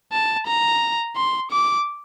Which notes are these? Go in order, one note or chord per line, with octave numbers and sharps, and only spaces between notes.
A5
A#5
C6
D6